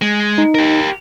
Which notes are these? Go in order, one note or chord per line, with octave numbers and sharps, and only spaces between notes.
G#3
D#4
G4 A#4